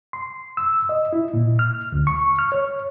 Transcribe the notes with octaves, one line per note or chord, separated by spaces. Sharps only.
C6
E6
D#5
E4
A#2
F6
D2
C#6
F6
C#5